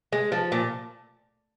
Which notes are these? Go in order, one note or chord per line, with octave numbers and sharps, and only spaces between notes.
G#3
F3
A#2